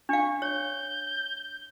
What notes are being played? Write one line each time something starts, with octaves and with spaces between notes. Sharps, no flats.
D4 F5 C#6
C#5 G6